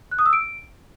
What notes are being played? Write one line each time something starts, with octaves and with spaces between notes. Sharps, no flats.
F#6
D#6
E6
D7